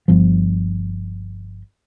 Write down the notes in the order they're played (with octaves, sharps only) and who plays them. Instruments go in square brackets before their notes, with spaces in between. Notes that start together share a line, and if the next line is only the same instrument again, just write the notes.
[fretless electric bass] G1 F3